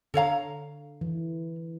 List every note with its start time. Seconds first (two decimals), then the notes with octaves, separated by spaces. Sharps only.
0.14 D3 A4 C#5 F5 A#5
1.01 E3